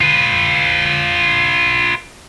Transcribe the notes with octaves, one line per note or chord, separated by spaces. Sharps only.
F4 B4